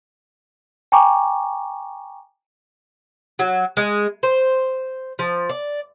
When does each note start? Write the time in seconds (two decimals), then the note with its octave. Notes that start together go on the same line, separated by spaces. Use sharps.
0.92 G5 G#5 A#5 C#6 D6
3.39 F#3
3.77 G#3
4.23 C5
5.19 F3
5.49 D5